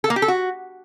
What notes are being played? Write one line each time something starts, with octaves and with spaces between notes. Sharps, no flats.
A4
A#3
G4
A4
F#4